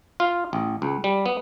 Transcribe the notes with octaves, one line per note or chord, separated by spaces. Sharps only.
F4
A1
C#2
G3
B3